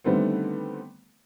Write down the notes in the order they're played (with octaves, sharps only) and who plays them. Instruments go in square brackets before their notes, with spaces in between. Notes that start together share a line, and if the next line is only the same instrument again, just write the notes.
[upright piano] D3 D#3 G3 A3 B3 C4